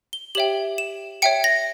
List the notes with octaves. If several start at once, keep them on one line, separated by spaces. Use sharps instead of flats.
G7
G4 C#5 E5 G5 F#7
E7
C#5 E5 G5 C#7
A#6